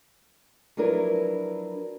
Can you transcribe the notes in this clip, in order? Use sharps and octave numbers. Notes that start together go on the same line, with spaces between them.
F3 F#3 D4 E4 A#4 B4